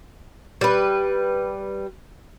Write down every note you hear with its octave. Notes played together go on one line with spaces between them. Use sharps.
G3 B4